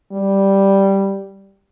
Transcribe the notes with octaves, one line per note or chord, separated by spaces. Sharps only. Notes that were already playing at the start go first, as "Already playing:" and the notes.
G3